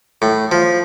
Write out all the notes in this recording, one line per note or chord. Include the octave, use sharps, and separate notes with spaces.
A2
F3